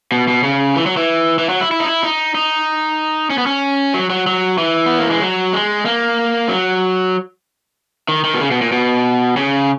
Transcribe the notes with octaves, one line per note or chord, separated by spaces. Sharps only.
B2
B2
C#3
E3
F#3
E3
E3
F#3
E4
E4
D#4
E4
D#4
D#4
C#4
B3
C#4
F#3
F#3
F#3
E3
B3
A#3
G#3
F#3
G#3
A#3
F#3
D#3
D#3
B2
C#3
B2
A#2
B2
C#3